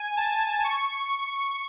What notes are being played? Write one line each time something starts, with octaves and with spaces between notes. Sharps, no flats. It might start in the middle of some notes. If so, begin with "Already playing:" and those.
Already playing: G#5
A5
C#6